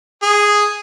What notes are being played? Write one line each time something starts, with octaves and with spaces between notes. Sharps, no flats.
G#4